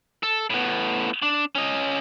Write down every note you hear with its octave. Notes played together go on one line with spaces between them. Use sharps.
A4
A2 B3
D4
C#4 D#5